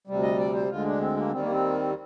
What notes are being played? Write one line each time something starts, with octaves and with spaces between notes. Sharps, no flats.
D2 C3 G3
D#5
D5
C5
D2 D3 G#3 F4
D4
C4
A#3
D#2 D#3 G3 C4
A#3
C4